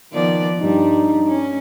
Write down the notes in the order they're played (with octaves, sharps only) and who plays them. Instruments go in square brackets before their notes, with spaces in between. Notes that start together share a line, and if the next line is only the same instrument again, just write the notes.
[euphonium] D#3 [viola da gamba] F3 B3 D5
[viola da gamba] G2 G3 [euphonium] D#4
[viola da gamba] C#4